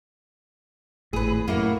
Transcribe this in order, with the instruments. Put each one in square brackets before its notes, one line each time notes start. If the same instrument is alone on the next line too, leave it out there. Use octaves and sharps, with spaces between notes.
[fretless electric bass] G#1 A2 [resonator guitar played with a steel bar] G#4 B4
[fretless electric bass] F#2 A2 [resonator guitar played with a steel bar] A#3 E4 F#4